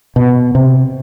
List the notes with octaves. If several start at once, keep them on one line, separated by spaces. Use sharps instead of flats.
B2
C3